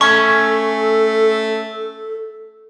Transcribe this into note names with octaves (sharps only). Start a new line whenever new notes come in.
A3 C#4 A4 C#6